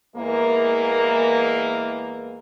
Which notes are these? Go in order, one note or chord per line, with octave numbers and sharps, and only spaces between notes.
E2 E3 G#3 A#3